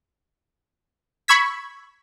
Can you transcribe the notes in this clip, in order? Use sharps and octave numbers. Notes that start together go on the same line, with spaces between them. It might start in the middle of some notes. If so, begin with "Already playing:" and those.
B5 C#6 E6 G#6 B6